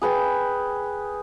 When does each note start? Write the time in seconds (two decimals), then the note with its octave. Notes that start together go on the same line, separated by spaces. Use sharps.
0.02 G#4 B4 G5 G#5